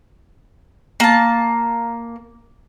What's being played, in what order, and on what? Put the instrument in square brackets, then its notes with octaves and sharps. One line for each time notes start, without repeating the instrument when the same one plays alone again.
[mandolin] A#3 A5